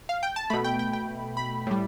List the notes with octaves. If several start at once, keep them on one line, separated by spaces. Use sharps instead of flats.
F5
G5
A5
B2 A3 B5
G5
G5
G5
B5
A2 G3